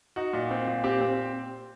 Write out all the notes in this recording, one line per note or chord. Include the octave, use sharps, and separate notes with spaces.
D#4 F#4
A#2
C4
A#2
C4 G4
C4